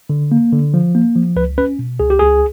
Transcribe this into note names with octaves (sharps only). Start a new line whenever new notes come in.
D3
A#3
D3
F3
A#3
F3
C#2 B4
C#4 B4
B2
C#2 G#4
G4
C#2 G#4